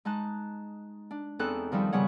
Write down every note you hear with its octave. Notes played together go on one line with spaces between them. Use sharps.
G#3 D#4 A5 F#6
D4
E2 C4 D#4 A4 F#6
D#3 F3 G3 D#4 A4
G#2 C#3 G3 B3 C#5 F#5